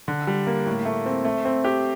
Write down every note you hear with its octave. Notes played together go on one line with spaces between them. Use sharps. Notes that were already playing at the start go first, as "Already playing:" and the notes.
D3
G3
A#3
A2
A3
C4
A3
C4
G4